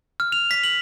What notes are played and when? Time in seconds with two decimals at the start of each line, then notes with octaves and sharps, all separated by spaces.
0.20 F6
0.32 F7
0.51 B6
0.64 F#7